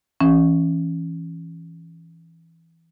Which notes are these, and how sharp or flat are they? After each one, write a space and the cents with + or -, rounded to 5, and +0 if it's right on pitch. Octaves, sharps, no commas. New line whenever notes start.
E3 +0 C#4 -5